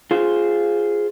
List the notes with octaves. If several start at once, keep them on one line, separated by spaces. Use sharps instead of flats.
F4 G#4 C5